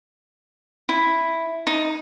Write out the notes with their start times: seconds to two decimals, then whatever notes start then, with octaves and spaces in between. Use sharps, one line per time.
0.89 E4
1.67 D#4